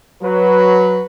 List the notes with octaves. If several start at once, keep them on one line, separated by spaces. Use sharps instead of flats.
F#3 B4